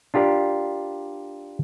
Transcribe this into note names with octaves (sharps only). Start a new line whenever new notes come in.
D4 F4 G4 A#4 D5